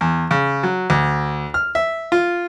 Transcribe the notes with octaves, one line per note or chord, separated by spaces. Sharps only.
E2
C#3
F#3
D2
F6
E5
F4